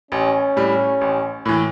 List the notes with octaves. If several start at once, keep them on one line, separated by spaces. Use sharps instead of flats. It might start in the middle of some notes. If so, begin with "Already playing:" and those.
A1 C#4
A2 G3
A1
A2 E3